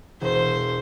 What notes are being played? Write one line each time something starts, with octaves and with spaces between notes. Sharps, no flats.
E1 C5